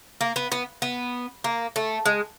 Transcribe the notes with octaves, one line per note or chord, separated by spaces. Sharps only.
A#3
B3
B3
B3
A#3
A3
G#3